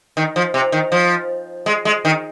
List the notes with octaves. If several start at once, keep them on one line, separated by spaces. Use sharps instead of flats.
D#3
F3
C3
D#3
F3
G#3
G#3
D#3